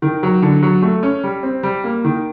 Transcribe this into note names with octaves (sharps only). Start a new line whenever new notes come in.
D#3
F#3
D3
F#3
A3
C#4
G3
C4
G3
A#3
D#3